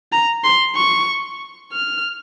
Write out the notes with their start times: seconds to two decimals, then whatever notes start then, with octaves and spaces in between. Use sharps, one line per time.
0.12 A#5
0.44 C6
0.76 C#6
1.73 F6